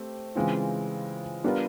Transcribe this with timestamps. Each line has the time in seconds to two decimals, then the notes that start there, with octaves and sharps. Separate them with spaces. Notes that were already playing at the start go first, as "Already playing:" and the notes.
Already playing: A3 C4 G4
0.35 C#3 E3 G#3 C4 F4
1.44 G3 B3 D4 F4 A#4